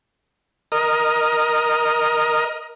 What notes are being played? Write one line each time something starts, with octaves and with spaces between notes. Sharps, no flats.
A#4 D#5